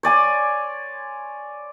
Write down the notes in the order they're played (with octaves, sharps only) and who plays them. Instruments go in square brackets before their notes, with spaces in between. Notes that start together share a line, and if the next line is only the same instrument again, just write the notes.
[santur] C#5 D5 G#5 C6